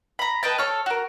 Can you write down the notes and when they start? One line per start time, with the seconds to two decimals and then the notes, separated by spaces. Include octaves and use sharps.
0.19 A#5 B5
0.43 B4 D#5 G5 A5
0.58 A4 C#5 F6
0.86 F#4 A#4